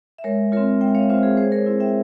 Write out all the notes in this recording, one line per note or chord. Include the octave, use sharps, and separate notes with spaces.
E5
G#3 A#4 C#5
C4 F4 A#4 C#5
G#3 E5 G5
C#5 F5
C4 F4 C5 E5
G#4 C5
G#3 G#4 C5
A#4 C#5
C4 E4
E5 G5